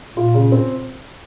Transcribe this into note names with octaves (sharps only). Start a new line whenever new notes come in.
A#2 F4
C#3
C4